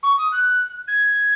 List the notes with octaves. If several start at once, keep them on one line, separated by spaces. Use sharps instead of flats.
C#6
D#6
F#6
G#6